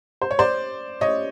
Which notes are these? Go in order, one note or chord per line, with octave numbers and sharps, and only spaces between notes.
C5
C#5
C5 D5
C#5 D#5